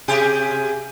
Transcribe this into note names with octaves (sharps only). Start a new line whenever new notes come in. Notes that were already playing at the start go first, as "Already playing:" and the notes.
C3 G4 G#4